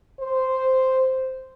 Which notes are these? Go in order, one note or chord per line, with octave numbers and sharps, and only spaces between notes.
C5